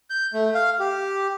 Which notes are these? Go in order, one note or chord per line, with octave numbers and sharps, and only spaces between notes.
G6
A3
F5
G4